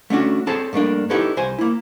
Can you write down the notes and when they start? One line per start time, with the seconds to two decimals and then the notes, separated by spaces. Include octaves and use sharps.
0.10 A3 C#4 D4 F#4
0.47 C4 G#4 A4 C5 C#5 A5
0.73 G2 A3 A#3 D4
1.10 D#4 E4 G4 A4 B4 C#5
1.37 C2 C5 G#5
1.58 A#3 E4